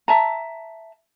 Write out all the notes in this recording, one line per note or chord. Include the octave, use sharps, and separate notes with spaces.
E5 A5 A#5